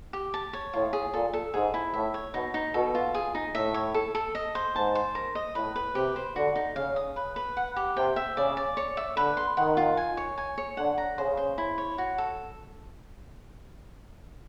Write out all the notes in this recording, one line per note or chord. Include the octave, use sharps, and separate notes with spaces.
G4
A5
C#5
A2 F4
G#4
A#2 A4
A4
G#2 G#4
E4
A2 E5
C#5
B2 D#4
D#4
B2 A4
F4
G#4
D#4
A2 E5
C#5
A4
A4
D#5
C5
G#2 A5
C5
A#4
D#5
A2 B4
B4
C3 G4
C5
D3 F#4
D#4
C#3 F5
D#6
B4
B4
F#5
G4
C3 G5
E5
C#3 D5
D5
C#5
E5
D3 B4
C6
D#3 F#5
F4
G#5
C#5
G#5
C#5
D3 F#5
A#5
C#3 C5
C5
E4
C#5
F#4
A4